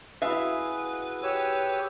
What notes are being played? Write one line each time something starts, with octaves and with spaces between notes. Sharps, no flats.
E4 F#4 G#4 B4 E5 F5
G4 C#5 E6